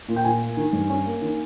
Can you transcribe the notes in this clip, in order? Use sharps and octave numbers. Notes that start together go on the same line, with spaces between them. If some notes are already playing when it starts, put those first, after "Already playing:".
A#2
G5
A#2 G#5
A#3
D#3
G2
C#4
A#3
D#3